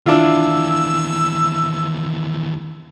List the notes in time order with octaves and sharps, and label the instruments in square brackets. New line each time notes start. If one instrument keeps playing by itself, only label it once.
[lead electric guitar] D#2 E3 [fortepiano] D4 E4 F4 [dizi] E6